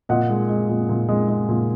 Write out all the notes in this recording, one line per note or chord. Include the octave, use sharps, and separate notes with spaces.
A#2 D#5 F#5
G#3
G#3
A#2
A#2
G#3
G#3
A#2